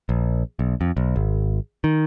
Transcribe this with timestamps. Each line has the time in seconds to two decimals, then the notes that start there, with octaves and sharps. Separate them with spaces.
0.09 A#1
0.59 B1
0.81 F2
0.97 B1
1.16 G#1
1.84 D#3